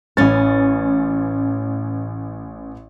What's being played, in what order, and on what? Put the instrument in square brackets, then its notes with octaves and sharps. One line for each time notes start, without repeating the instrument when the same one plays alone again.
[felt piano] A1 A6 [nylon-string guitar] C#4 B4 C#5